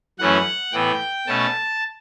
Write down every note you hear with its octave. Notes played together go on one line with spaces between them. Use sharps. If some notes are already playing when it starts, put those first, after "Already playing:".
F#2 E3 A3 C#4 F#5
A2 E3 B3 G5
B2 A3 C#4 A5